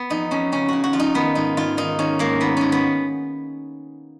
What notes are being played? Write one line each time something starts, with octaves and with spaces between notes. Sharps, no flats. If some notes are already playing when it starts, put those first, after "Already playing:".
Already playing: B3
F2 D#4
F2 C#4
C#3 C#4
C#3 F#4
F#4
F2 F4
D#4
D#3 B3
G#2 D#4
G#2 F4
D#3 D#4
D#3 C#4
G#2 A#3
D#3 B3
G#2 C#4
B3